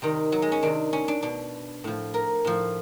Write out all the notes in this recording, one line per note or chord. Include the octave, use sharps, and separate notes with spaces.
C3 D#3 G3
F#3
G#3
C#4
C3 D#3 D4
C#4
D4
B2 D4
A2 F3
A#4
A2 F3